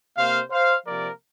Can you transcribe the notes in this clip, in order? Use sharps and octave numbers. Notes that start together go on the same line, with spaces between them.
C3 A#3 C5 F5
C5 F5
C3 F3 A#3 A#4 D5